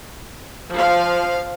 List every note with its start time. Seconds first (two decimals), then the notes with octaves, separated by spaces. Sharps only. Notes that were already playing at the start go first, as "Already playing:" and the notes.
0.74 F3 F5